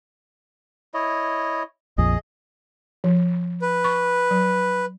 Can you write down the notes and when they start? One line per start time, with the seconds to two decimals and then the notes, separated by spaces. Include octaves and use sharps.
0.94 E4 C#5 D#5
1.98 A#1 F2 G#4 D#5
3.04 F3
3.62 B4
3.84 C#6
4.31 F#3